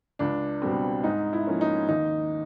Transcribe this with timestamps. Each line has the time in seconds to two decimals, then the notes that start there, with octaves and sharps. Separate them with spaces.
0.19 C#2 D4
0.62 B2 G3 C4
1.04 G#2 D#4
1.33 E4
1.47 F3 A#3 C#4
1.61 D#4
1.88 D#2 D#4